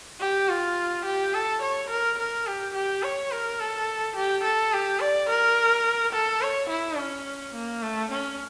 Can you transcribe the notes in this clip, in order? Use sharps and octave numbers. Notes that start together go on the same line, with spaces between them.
G4
F4
G4
A4
C#5
A#4
A#4
G4
G4
C#5
A#4
A4
G4
A4
G4
D5
A#4
A4
C#5
E4
C#4
A#3
A3
C#4